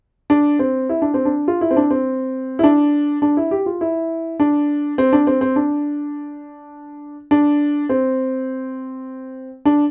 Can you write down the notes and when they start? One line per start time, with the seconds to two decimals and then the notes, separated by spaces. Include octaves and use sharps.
0.30 D4
0.59 C4
0.89 E4
1.02 D4
1.14 C4
1.25 D4
1.48 F4
1.61 E4
1.71 C4
1.77 D4
1.90 C4
2.59 E4
2.64 D4
3.22 D4
3.37 E4
3.51 G4
3.66 F4
3.81 E4
4.40 D4
4.98 C4
5.13 D4
5.27 C4
5.41 C4
5.56 D4
7.31 D4
7.89 C4
9.65 D4